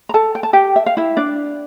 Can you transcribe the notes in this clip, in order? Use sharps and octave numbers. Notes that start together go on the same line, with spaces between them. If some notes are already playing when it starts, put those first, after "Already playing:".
A#5
A4 A5
G5
A5
G4 G5
E5
F5
E4 E5
D4 D5